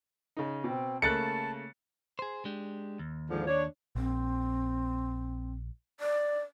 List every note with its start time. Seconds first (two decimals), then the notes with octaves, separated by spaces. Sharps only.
0.37 C#3 D#4
0.64 B2 C4
1.02 C#3 A3 A#3 A5 F#6 A6 C#7
2.19 G#4 C5
2.45 G#3 D4 G4
2.99 D#2
3.30 G#2 D3 F3
3.47 D4 C#5
3.95 A#1 C4
6.00 D5